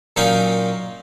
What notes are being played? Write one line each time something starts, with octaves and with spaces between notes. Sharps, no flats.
A#2 F#3 C#4 D#4 F5 G5